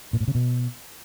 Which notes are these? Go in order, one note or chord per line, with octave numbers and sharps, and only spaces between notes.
A#2
A2
C#3
B2